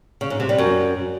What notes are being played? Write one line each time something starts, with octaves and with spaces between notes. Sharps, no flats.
C#3
G#2
C3
G3
F#2